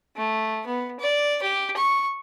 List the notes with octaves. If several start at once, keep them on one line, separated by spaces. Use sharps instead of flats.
A3
B3
D5
G4
C#6